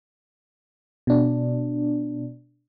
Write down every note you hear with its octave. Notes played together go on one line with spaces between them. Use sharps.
B2 D4